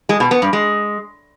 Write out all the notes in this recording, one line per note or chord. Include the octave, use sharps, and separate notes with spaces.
G#3
B2
B3
G2
G#3